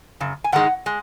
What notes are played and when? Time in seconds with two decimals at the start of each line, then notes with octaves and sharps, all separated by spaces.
0.20 F#2 C#3
0.44 G#5
0.52 G#2 D#3 G#3 D#4 F#5
0.86 G#3